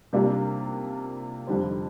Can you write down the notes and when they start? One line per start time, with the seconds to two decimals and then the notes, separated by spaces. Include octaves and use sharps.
0.13 C3 G3 A#3 D4 F4
1.47 F2 D3 G3 C4